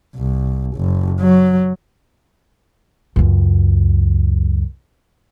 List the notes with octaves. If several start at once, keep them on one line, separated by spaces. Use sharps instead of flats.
C2
F#1
F#3
C#2 F#2